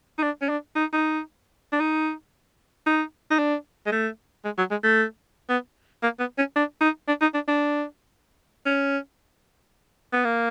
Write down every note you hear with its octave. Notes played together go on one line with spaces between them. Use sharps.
D#4
D4
C#4
D4
D#4
D#4
D4
D#4
D#4
D#4
D4
G#3
A3
G#3
F#3
G#3
A3
B3
A#3
B3
C#4
D4
D#4
D4
D#4
D4
D4
C#4
B3
A#3